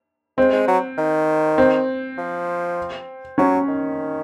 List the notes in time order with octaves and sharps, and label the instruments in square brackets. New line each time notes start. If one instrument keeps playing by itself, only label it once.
[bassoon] G#3 [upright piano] C4
[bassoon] G#3
F#3
D#3
[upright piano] C4
[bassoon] F3
[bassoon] F#3 [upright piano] C#4
[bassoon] D#3